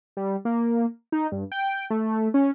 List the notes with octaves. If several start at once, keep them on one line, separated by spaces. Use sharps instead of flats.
G3
A#3
D#4
G2
G5
A3
C#4